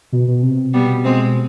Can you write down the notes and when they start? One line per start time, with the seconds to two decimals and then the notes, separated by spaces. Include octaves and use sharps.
0.12 B2
0.28 B2
0.43 C3
0.74 B2 G3 B3
1.04 B2 G#3 C4